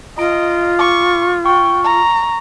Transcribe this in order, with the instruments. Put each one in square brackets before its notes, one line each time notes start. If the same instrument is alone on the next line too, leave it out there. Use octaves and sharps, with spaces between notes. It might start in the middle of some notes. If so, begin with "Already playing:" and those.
[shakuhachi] F4 [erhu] D#5 [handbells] A#5 D7
[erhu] C#6 [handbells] D6
[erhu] G5 [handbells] C#6
[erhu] A#5